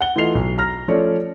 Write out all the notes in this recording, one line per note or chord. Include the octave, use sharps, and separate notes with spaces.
F#5 G7
E3 A3 F4 D#5 C7 F7
B1
A#5 F6 A#6
F3 A3 C#4 C#5 D5